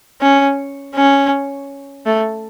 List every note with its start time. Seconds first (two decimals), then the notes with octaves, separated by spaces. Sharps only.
0.21 C#4
0.95 C#4
2.06 A3